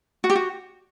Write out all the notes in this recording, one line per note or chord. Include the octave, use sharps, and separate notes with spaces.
F#4
G4
F#4